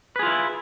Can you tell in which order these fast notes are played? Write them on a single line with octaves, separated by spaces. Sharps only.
B4 G#4 F4 E4